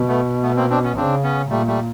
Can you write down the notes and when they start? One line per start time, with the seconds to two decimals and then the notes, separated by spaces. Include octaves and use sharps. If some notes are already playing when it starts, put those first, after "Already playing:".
Already playing: B2
0.08 A3 B3
0.43 A3 B3
0.57 A#3 C4
0.70 C4 D4
0.83 B3 C#4
0.96 C#3 C4 D4
1.23 B3 C#4
1.50 A#2 G3 A3
1.67 G3 A3